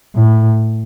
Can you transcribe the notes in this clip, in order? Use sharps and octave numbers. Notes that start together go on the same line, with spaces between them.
A2